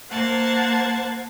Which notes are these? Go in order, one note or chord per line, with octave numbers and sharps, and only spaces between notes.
A#3 C5 F#5 A5 G#6